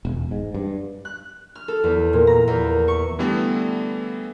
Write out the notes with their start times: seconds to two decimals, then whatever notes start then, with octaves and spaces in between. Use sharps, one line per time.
0.05 E1
0.31 G#2
0.54 G2
1.05 F#6
1.55 F6
1.68 A4
1.84 E2
2.13 A#2
2.27 A#5
2.48 E2
2.88 C#6
3.19 D3 E3 G3 A3 B3